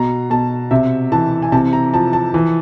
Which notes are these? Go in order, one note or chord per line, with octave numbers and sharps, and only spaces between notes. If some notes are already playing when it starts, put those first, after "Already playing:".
Already playing: B2 A#5
B2 A5
C3 E5
E3 A5
G#5
C3 A5
A#5
F3 A5
A5
E3